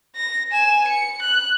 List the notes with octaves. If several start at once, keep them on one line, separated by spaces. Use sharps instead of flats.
A#6
G#5 E7
C#7
F#6